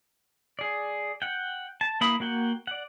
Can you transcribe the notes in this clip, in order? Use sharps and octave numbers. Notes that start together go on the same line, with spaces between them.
G#4 D5
F#5 G5
A5
A#3 E4 B5 D#6
A#3 F#4 F#5 G5
D5 F#5